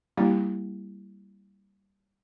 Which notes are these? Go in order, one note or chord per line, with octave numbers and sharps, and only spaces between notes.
G3 A#3 C4 D4 E4 G4